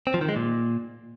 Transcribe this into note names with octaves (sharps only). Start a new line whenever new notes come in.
C4
F3
D#3
G#3
A#2